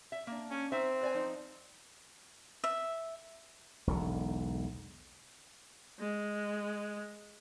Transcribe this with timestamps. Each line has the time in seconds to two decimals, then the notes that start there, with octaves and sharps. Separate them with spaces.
0.12 E5
0.27 A#3 D4
0.51 C#4
0.72 C4 D#4 C5 E5
1.01 B4 D5 G#5
1.14 F3 D#4
2.64 E5
3.87 E1 B1 D3
5.99 G#3